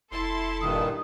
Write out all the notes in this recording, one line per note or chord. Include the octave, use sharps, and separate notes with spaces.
F1 E4 A4 A5 C6
G2 A#2 D#3 D#6